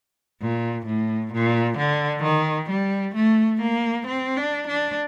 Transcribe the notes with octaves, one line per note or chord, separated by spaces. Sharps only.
A#2
A2
A#2
D3
D#3
G3
A3
A#3
C4
D4
D4